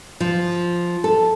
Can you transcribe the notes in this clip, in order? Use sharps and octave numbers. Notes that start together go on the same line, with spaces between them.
F3
A4